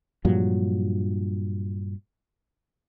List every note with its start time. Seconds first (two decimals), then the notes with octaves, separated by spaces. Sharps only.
0.25 G2 A#2 F3 F#3